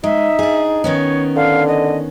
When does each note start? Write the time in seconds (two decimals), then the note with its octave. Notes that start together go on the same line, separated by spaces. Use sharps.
0.04 G#3 D#4 E5
0.39 D4 G#4
0.84 D#3 B3 C#4 C#5
1.36 D3 F5
1.68 D#5